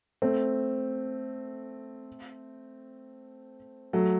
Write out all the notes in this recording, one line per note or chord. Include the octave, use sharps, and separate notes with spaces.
A3 C4
F#3 A3